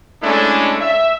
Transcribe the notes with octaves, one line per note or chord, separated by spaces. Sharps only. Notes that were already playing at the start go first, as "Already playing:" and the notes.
G#3 A3 C#4 D4 E4 A4
E5